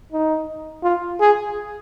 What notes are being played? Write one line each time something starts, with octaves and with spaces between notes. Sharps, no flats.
D#4
F4
G#4